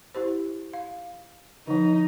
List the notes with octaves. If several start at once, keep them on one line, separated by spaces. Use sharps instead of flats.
E4 G4 C5
F5
D3 F3 D#4